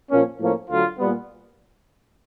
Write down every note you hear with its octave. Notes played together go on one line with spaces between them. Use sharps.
A#2 F3 A#3 C#4
A2 F3 A#3 C#4
D2 D3 F#3 F4
A#2 G3 B3